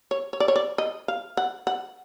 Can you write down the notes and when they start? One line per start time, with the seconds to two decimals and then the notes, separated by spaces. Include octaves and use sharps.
0.11 C#5
0.33 C#5
0.40 D5
0.48 C#5
0.56 D5
0.78 D#5
1.08 F5
1.37 F#5
1.67 F#5